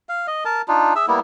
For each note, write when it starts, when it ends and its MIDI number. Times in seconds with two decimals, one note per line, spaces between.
0.09 0.27 77
0.27 0.44 75
0.45 0.62 70
0.45 0.62 81
0.68 0.94 62
0.68 0.94 63
0.68 0.94 65
0.96 1.06 68
0.96 1.06 76
0.96 1.06 88
1.08 1.20 55
1.08 1.20 58
1.08 1.20 59
1.08 1.20 64